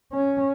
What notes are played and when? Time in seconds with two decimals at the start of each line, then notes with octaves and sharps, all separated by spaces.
0.13 C#4